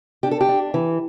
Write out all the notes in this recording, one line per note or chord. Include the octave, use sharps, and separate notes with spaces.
D4 G4
A4
G4
D4
E3